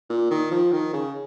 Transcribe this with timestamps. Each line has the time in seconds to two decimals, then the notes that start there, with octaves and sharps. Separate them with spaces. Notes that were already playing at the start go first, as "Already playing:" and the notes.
0.10 A#2
0.31 D#3
0.51 F3
0.72 D#3
0.93 C#3